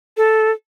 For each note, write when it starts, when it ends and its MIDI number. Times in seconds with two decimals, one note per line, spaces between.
0.17 0.51 69